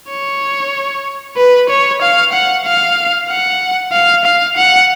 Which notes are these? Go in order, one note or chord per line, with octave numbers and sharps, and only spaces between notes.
C#5
B4
C#5
F5
F#5
F5
F#5
F5
F5
F#5